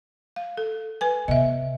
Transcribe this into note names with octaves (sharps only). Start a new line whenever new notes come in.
F5
A4
B4 G#5
C3 B3 D#5 E5